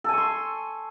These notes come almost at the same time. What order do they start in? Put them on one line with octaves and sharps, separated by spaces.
A4 G#5 C#6 C6